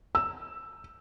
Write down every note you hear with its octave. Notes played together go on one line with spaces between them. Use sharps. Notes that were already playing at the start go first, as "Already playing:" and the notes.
E6